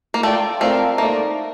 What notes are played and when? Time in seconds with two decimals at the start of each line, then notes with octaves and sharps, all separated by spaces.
0.14 A#3
0.23 A3 F4 A4 D5 G5
0.60 A3 C4 F4 A#4 D5 F5
0.98 A3 A#3 D#4 A#4 D5